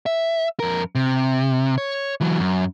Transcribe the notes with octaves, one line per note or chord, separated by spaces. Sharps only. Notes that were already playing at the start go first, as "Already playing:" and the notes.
E5
F2 A#4
C3
C#5
E3 F#3
F#2